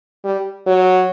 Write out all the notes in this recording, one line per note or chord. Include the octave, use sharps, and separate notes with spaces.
G3
F#3